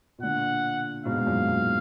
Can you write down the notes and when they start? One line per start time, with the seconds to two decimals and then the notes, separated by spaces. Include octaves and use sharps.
0.19 B2
0.23 A#2 D3 F#5
1.05 G#2 B2 F5
1.18 G#2
1.27 F#2 A#2
1.47 F#2